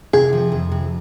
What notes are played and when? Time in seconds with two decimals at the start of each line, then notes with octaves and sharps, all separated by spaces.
0.13 C3 G#4
0.33 F3
0.52 F2
0.72 C3